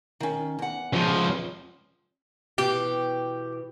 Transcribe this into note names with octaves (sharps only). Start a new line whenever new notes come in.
D#3 C#4
E2 F#5
C#2 F3
B2 E3 G4